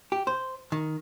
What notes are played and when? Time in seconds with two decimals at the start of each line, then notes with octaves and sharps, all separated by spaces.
0.12 G4
0.27 C5
0.72 D#3